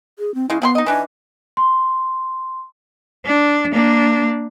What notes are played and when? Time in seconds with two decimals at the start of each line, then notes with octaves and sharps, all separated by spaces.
0.19 G#4
0.35 C4
0.50 C#3 G#3 E4
0.62 F3 B3 G#4 C6
0.75 D#4 D#5
0.86 E3 D4 D#4 G#5
1.57 C6
3.26 D4
3.72 A#3 D4